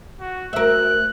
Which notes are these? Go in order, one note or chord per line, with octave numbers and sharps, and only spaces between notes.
F#4
D2 A#4 E5 F#6